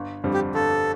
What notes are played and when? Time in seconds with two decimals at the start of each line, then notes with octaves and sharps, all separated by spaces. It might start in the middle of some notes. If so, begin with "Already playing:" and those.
Already playing: G1
0.24 F2 D3 G3 C4
0.34 G4
0.55 G1 A4